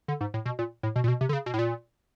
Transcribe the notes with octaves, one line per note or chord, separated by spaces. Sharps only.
D3
G#2
A2
B2
A#2
A2
B2
A#2
B2
C3
D3
C#3
B2
A2
A#2